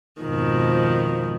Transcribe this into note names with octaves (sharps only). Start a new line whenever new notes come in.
F2 G#2 B2 D#3 F3